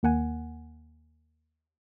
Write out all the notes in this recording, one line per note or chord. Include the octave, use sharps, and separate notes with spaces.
D#2 A#3 F#5 G#5